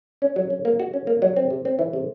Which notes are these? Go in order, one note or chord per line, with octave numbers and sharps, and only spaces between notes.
C#4
F#3
C#4
A#3
F#4
C#4
A#3
F#3
C4
C3
C4
E3
C3